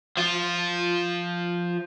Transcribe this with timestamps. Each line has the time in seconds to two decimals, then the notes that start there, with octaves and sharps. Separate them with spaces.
0.17 F3 F4